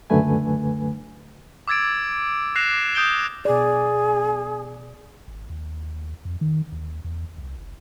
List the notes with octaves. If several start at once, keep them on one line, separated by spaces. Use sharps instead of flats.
C#2 F#2 D3 A3 B4 G#5
D6 E6 G#6 A6 D7
D6 F#6 A#6 C7 E7 F7
D#6 G6 D7 G7
B2 G#4 D5
G#1
D#2
F2
D#3
D#2
E2
C2
F#1